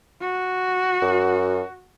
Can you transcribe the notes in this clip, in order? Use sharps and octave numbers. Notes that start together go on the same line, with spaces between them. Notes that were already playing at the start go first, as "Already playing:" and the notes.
F#4
F#2